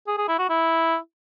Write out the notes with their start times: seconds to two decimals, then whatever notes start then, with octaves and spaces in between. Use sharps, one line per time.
0.07 G#4
0.18 G#4
0.28 E4
0.39 F#4
0.49 E4